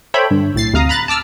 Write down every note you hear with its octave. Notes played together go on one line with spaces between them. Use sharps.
A4 C5 C#5 E5 G5 B5
G2 D3
B1 A2 A6 C7
D2 C3 F5 A#5 D#6
A#5 B5 F#6 A6
A5 D6 E6 F6